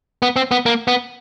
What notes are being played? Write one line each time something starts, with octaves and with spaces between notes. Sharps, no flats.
B3
C4
B3
A#3
B3